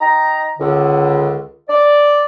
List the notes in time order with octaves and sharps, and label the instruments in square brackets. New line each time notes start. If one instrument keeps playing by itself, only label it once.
[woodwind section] D#4 G5 A#5
C#2 D3
D5